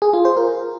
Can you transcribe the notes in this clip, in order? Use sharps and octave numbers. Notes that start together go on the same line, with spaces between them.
G#4
F4
C5
A#4